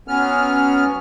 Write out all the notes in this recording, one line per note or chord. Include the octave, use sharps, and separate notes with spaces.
F#3 B3 C#4 F6